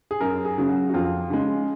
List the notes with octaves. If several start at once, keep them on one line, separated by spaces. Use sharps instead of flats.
G#4
F#2 A#4
G#4
C#3 F#3
F#4
F#4
F2 F4
C#3 G#3